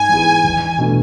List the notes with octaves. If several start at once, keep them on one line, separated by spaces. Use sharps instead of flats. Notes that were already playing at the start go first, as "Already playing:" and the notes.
Already playing: G#2 G#5
E3 B3 E4 G#4
E2
B2 A3 D4 A4